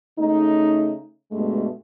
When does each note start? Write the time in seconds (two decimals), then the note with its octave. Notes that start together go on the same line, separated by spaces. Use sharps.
0.18 C#3 A3 D#4
1.31 G2 B2 G#3 A3